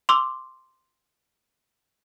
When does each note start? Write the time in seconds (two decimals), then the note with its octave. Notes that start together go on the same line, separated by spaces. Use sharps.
0.09 C6 D6 E6